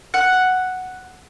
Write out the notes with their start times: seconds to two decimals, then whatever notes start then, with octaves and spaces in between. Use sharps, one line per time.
0.14 F#5